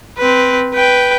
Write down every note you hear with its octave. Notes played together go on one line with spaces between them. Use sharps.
C4 B4
B4 G5